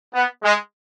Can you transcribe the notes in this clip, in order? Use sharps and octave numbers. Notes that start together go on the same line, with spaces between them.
B3
G#3